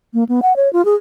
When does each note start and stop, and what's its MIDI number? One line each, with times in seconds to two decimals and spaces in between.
0.14 0.24 58
0.29 0.40 59
0.42 0.56 78
0.56 0.71 73
0.73 0.84 65
0.85 0.95 68